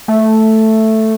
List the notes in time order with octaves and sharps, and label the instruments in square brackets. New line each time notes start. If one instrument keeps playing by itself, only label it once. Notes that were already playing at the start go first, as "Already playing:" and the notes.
[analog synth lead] A3